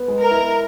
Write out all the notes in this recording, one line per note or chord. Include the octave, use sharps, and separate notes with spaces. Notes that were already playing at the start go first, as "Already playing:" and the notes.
Already playing: B3
G#3
A#4
E4